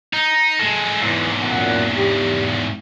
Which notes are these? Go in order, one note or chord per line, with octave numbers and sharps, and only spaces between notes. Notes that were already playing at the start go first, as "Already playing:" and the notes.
D#4
G#3 A4
E2 G#2 E3
F#2 A#2 F#5
G4